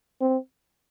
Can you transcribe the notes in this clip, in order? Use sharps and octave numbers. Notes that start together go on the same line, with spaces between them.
C4